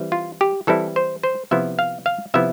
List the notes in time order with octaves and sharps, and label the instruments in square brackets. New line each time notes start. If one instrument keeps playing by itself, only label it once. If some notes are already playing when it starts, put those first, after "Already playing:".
Already playing: [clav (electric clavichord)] E3 G3 C4 E4
F4
G4
E3 G3 C4 E4 A4
C5
C5
C3 F3 B3 E4 E5
F5
F5
C3 F3 B3 E4 E5